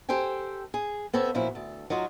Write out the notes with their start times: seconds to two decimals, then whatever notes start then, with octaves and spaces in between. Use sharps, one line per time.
0.09 G4 A4 C5 G5 G#5
0.74 G#4
1.13 B3 C4 A4 C#5 E5
1.35 A#2 F3 F#3 E4
1.55 D2 A4
1.90 F#3 D#4 F4 F#4